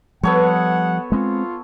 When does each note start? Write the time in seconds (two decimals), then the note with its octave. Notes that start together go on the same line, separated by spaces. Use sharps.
0.23 F3 G3 B3 A4 C#5 F#5
1.12 G#3 C4 F4